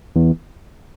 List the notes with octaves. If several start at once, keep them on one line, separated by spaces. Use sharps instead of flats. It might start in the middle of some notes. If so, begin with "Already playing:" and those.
E2